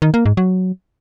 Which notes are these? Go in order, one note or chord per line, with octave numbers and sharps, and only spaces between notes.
D#3
A#3
G#2
F#3